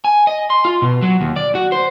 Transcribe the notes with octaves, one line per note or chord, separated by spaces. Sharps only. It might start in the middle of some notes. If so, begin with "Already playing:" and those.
G#5
D#5
C6
F4
B2
F#3
D#2
D5
F#4
C5